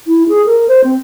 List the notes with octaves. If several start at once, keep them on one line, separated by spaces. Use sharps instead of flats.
E4
G#4
A#4
C5
C4